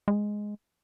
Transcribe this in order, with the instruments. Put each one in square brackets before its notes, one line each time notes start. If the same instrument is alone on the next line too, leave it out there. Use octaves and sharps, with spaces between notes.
[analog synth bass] G#3